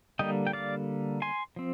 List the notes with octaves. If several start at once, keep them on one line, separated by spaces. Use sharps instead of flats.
D3 G3 A#3 D#5 G5
G5
D5 F5
G#5 C6
F3 C4